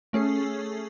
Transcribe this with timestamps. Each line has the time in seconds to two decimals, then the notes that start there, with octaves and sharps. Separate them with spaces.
0.13 A3 C#4 G#4 A4 C7